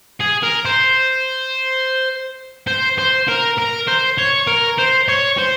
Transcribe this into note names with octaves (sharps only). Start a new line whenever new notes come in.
G#4
A#4
C5
C5
C5
A#4
A#4
C5
C#5
A#4
C5
C#5
C5